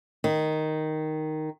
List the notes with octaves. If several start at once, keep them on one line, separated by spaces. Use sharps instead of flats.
D#3